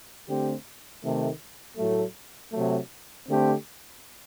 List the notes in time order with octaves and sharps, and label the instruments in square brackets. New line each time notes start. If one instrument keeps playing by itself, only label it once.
[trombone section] D3 A3 C4 G4
C3 D#3 A3
A2 F#3 A3
C3 F#3 A3
D3 A3 C4 G4